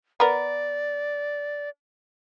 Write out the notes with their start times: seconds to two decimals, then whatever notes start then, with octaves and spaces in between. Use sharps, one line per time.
0.20 B3 A#4 D5